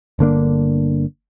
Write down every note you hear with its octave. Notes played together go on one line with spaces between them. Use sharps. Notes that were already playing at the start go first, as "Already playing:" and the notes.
G1 D3 A#3 D4